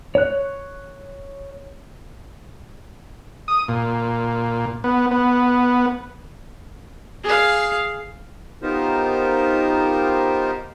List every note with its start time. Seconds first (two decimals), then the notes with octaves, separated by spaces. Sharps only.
0.15 C#5 F#6
3.48 D#6
3.68 A#2
4.84 B3
5.11 B3
7.23 G#4 F5
8.62 B3 D#4 F4 G4 A#4 C5